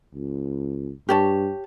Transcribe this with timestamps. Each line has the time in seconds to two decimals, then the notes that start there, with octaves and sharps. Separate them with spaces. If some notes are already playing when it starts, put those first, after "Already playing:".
0.15 C#2
1.09 G2 G4 C#5 A5